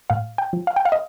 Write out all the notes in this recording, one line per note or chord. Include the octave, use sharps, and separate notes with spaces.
A2 F5
G5
F3
F5
G5
F5
D#5